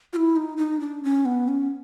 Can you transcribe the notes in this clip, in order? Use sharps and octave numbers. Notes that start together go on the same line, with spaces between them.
F4
E4
D#4
D#4
D4
C#4
B3
C#4